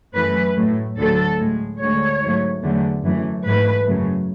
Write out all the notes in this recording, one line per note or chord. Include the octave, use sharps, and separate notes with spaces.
F#2 E3 A3 B4
A2 F#3 A3
D2 D3 F#3 A3 A4
A2 G#3
D2 D3 G#3 C#5
G#2 F#3 A3
E2 D3 F#3 A3
F#2 E3 A3
G#2 E3 A3 B4
F#2 C#3 F#3 A3